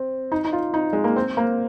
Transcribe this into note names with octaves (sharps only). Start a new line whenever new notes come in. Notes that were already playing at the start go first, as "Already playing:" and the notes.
Already playing: C4
D#4
D#4
F4
D#4
G#3
A#3
C4
A#3